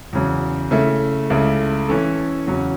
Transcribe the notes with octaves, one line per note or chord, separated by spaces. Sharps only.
E2 C#3 F#3
C#3 A3 E4
C#2 C#3 A3 E4
E3 C#4 A4
E2 C#3 F#3 C#4